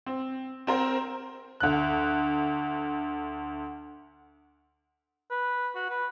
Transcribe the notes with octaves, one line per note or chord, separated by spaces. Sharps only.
C4
C4 A#4 C5
D2 F#6
B4
F#4
B4